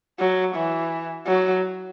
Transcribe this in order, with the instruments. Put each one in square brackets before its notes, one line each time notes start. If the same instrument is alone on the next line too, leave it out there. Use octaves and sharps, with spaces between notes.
[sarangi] F#3
E3
F#3